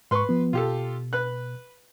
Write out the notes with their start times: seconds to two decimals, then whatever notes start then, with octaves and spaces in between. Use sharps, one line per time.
0.11 G#2 B4 C6 C#6
0.29 F3 B3
0.53 B2 F4 G4 A4
1.13 B4 F#6